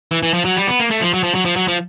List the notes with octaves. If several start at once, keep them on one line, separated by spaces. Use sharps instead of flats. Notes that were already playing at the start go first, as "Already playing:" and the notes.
E3
E3
F3
F#3
G3
B3
A#3
A3
F3
F#3
F3
F#3
F3
F#3
F3